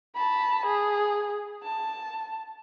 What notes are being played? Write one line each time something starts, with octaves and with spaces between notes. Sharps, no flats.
A5 B5
G#4
A5